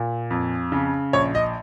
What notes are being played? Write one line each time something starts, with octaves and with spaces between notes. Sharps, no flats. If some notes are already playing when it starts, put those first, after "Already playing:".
Already playing: A#2
F2
C#3
A#1 C#5
D#5